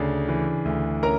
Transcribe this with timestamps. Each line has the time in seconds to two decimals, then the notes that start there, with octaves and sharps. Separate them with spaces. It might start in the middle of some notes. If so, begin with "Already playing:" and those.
Already playing: D2 C#3 D4
0.28 E3
0.65 D2
1.03 C#4 A#4 A#5